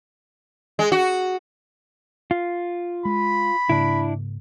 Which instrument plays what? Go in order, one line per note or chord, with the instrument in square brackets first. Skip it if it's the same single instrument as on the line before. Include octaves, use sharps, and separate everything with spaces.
[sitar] G#3
F#4
[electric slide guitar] F4
[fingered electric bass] G#3 [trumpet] B5
[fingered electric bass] G#2 C#3 A#3 [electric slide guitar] D4 E4